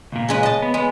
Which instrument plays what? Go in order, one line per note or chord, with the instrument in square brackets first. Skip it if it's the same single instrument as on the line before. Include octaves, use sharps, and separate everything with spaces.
[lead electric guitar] C#2 A#2
[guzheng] C#3 G#3 B4
D#5 A5
[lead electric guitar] B3
[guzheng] G#3 [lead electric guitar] B3